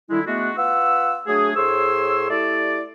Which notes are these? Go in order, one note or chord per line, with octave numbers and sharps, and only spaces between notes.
D3 D#3 G3 G#3 E4
G#3 A3 B3 D4 F#4
F4 B4 F#5 E6
F#3 A3 D4 G#4
A2 G#4 C5 C#5 C6 E6
A3 E4 G4 D5